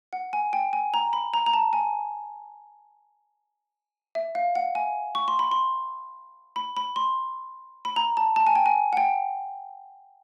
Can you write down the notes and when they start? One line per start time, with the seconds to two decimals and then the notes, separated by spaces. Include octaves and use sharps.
0.13 F#5
0.33 G#5
0.53 G5
0.73 G#5
0.94 A#5
1.13 B5
1.34 A#5
1.46 A#5
1.53 A5
1.73 G#5
4.15 E5
4.35 F5
4.55 F#5
4.75 G#5
5.15 C#6
5.28 C6
5.39 B5
5.51 C6
6.56 B5
6.77 B5
6.96 C6
7.85 B5
7.96 A#5
8.17 A5
8.36 A5
8.47 G#5
8.55 G5
8.66 G#5
8.93 F#5
8.97 G5